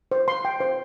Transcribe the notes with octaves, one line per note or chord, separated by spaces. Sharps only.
C5
C6
G5
C5